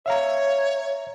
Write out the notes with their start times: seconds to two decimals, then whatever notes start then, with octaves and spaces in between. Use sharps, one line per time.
0.06 C#5 E5 F5 A#5